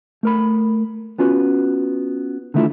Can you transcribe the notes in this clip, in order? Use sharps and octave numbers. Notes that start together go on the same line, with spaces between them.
A3 A#4 B5
B3 C#4 F4 F#4 B4
D3 D#3 A3 E4 F4 A4